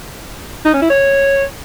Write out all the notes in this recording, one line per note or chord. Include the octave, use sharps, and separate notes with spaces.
D#4
C#4
E4
C#5